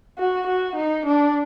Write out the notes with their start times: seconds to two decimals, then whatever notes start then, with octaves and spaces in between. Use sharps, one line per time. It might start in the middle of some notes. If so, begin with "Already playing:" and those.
0.18 F#4
0.47 F#4
0.76 D#4
1.06 D4